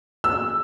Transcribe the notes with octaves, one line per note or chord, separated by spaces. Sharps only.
E6